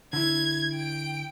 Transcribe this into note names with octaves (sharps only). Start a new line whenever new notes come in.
D3 E4 G#6
G5 D7